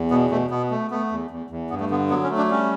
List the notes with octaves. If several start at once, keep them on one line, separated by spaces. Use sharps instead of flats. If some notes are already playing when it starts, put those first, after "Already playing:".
Already playing: E2
B2 B3
B2 A3
B2 B3
A3
A3 B3
E2
E2
E2
G2 B3
A3
D3 B3
F#3 B3
C#4
A3
D4
G3 C#4